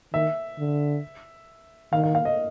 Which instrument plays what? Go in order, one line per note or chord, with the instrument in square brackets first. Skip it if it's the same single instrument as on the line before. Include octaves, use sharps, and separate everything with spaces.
[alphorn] D#3 [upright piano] E5
[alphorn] D3
[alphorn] D#3 [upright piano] F5
[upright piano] F5
F5
D#5